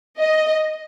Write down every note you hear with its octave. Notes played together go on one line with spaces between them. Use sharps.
D#5